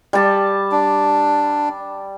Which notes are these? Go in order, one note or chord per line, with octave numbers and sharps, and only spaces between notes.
G3 A5
D4